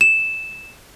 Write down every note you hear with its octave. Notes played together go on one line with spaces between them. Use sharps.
E7